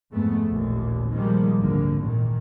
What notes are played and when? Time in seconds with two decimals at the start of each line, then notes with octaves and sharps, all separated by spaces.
0.11 F2 G#2 A3 B3
0.46 A1 D#2 A#2
1.11 A#2 D#3 F3 G3 G#3 A#3
1.58 G#1 D2 D3 A#3
1.99 E2 A#2 D#3